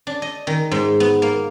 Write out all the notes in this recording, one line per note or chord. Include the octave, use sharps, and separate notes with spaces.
D4
D#5
D#3
G#2
B3
A#3